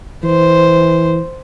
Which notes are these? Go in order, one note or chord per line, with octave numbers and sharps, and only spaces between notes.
E3 C5